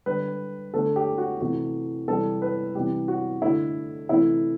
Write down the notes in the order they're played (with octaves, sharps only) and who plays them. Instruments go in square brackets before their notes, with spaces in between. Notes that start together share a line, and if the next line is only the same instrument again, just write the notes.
[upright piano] D3 G3 B4
D3 A3 A4
G4
F#4
C3 E3 A3 F#4
C3 E3 G3 A4
B4
C3 E3 G3 G4
F#4
D3 A3 E4
C3 E3 A3 E4